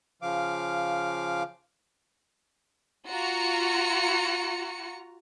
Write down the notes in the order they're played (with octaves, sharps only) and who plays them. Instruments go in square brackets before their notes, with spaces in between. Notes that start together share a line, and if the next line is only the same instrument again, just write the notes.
[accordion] C#3 F3 F5 D6
[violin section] F4 F#4 A#5 C#7